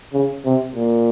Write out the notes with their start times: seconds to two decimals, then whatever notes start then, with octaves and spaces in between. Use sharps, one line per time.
0.13 C#3
0.45 C3
0.75 A#2